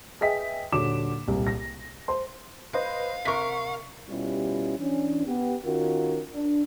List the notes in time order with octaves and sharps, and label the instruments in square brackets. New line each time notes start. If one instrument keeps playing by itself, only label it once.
[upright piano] G#4 B4 D#5 E5 G5 B6
D#1 D3 F#4 C#5 D6 E7
D#1 C2
A#6
C5 C6
[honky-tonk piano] B4 C5 D#5 [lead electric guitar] F5
[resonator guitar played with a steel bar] C3 A#4 [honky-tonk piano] C#6 B6
[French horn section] B2 G3 C#4 E4 F4 G4
E3 C#4 D4
B3 G4
D#3 C#4 F4 F#4 A#4
D4